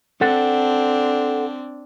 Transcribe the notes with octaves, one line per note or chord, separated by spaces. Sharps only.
C4 D4 A4 F#5